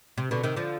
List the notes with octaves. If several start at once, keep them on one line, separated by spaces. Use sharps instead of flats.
C3
B2 D3
C3 D#3
D3 F3